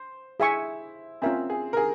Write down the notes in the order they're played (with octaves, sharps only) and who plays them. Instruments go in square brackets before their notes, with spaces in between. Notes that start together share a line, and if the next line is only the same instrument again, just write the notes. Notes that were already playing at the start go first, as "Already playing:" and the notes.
Already playing: [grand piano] C5
[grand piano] E4 [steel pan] G#4 E5 G#5 C#6
[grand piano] C4 [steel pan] C#4 F4 A#4 E5 G#5
[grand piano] G#4
A#4
G#4